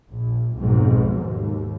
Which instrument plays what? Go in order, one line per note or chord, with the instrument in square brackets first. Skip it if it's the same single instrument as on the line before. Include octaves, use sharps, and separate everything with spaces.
[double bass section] A#1
B1 F2 G#2 B2
D#2